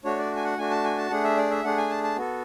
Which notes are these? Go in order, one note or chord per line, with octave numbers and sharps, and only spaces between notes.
A3 D4 F#4 C#5
D5
G#5
F#5
A3 D4 F#4 G#5
A5
G#5
A5
A3 D4 G#4 F#5
E5
D5
E5
A3 D4 G#4 F#5
G#5
A5
A5
B3 F#4 A4